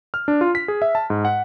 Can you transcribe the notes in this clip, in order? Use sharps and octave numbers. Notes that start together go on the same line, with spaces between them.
F6
D4
F4
B6
G#4
E5
A5
G#2
F#5